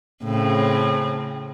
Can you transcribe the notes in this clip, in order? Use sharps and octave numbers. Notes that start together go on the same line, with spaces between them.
A2 C#3 C4